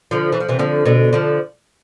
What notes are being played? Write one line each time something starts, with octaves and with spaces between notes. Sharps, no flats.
D3 F3
E3
F3
C3 E3
D3 F3
B2 D3
D3 F3